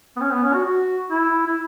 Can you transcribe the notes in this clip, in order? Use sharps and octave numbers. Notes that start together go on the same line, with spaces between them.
B3
C#4
B3
C#4
F#4
F#4
E4
E4